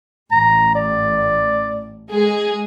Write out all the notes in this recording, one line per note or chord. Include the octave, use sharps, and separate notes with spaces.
A1 A#5
D5
G#3 G#4